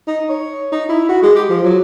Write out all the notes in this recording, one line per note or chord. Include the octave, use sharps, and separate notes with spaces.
D#4
C#5
D#4
E4
F#4
G#3
G4
F3
F#3